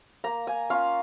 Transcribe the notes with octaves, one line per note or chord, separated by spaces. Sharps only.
A#3 A#5
G#5
C#4 F4 F5